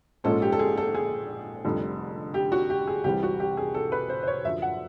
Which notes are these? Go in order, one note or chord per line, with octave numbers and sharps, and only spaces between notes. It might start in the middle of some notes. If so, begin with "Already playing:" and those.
A#1 G#2 F3 G#3 C#4 A4
G4
A4
G#4
A4
G#4
F1 F2 D3 G3
G4
F#4
G4
G#4
C2 C3 E3 G3 G4
F#4
G4
G#4
A4
B4
C5
C5
C#5
F#2 D3 F3 E5
F#5